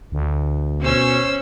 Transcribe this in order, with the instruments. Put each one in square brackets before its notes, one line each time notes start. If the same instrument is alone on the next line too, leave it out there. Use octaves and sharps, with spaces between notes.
[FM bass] D2
[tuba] B2 [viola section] C#4 [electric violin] C5 E6